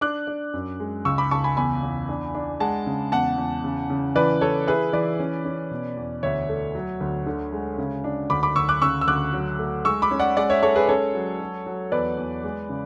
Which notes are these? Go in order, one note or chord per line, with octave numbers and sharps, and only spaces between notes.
D4 D6 F#6
D4
F#2
G#3
C#2 C#6 E6
B5 D6
C#2 A5 C#6
G#5 B5
E2 G#5 B5
E2
D4
D4
G#3 F#5 A5
C#3
E2 F#5 A5
E2
C#3
C#3
E3 B4 D5
E3 A4 C#5
E4 G#4 B4
E3 B4 D5
C#4
C#4
B2
E2
D2 C#5 E5
A3
F#3
D2
D3
G#3
C#3
D4
D2 B5 D6
B5 D6
D2 C#6 E6
D6 F#6
C#3 C#6 E6
E6
D2 D6 F#6
F#3
A3
G#3 C#6 E6
B5 D6
C#4
D5 F#5
G#3 D5 F#5
C#5 E5
G#3 A4 C#5
G#4 B4
C#4 A4 C#5
F#3
F#3
F#3
E2 B4 D5
E2
G#3
C#3